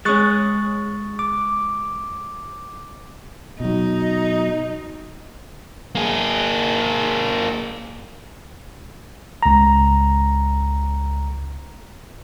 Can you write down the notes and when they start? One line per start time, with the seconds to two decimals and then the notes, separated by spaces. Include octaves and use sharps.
0.05 G#3 C#4 C#6 F#6 A6
1.19 D6
3.60 B2 F#3 D#4
5.95 A#3 G#4
9.43 C#2 A#5